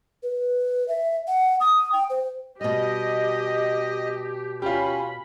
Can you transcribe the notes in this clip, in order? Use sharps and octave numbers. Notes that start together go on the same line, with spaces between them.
B4
E5
F#5
D#6
G5
C5
B2 G3 G4 D#5
C#4 F4 G4 B5